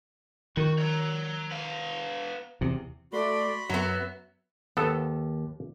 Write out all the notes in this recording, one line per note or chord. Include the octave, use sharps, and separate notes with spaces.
D#3 F#4
C#5 A#5
B3 F5
E2 C3
A3 F#4 D5 B5 C6
F#2 F#3 B3 E5
D#2 B3 A4